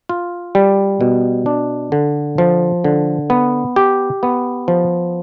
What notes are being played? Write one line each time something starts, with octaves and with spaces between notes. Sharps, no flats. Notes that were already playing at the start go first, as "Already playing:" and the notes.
F4
G3
B2
D4
D3
F3
D3
B3
G4
B3
F3